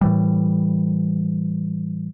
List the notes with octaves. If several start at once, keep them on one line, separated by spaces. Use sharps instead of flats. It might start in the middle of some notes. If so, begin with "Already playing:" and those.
A2 E3 G3